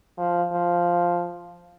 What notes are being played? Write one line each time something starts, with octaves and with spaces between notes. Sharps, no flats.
F3
F3